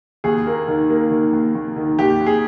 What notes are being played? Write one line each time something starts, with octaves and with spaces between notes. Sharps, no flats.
D#2 G#4
A#3
D#3
A#3
D#3
D#2
D#2
D#3
D#2 G4
D#2
G#4